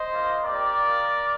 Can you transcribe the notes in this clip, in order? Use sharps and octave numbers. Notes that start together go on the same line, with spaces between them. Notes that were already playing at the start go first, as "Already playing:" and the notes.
Already playing: C5 D#5
A#3 F4
C4 G4 A#4 D5
A#3 D#4 G4